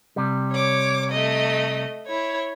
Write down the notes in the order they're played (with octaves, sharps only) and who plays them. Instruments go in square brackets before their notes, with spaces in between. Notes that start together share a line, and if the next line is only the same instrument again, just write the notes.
[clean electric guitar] C3 G3
[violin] C#5 D6
A3 D#5
E4 C#5